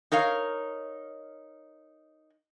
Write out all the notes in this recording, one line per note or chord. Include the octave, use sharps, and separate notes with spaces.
D#4 A#4 C#5 F5